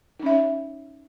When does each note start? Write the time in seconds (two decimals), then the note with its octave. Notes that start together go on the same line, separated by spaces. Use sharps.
0.19 D#4
0.23 C#4
0.26 E5
0.30 C#5